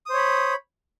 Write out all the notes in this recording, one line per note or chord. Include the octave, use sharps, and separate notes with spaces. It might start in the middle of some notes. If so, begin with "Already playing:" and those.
C5 C#5 B5 D#6